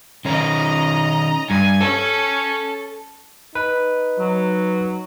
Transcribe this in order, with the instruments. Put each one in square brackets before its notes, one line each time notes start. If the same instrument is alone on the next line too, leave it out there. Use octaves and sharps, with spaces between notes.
[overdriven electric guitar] D#3 C#4 [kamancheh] D#5 A#5
[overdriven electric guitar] G2 [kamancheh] G#5
[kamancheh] C#4 [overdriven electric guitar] A4
[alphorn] D#4 [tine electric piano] B4
[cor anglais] F#3